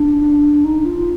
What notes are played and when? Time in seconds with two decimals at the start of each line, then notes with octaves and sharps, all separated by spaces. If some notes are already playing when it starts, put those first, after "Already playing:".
Already playing: D4
0.64 D#4
0.85 F4